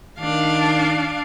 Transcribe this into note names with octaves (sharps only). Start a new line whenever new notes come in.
D#3 D4 F5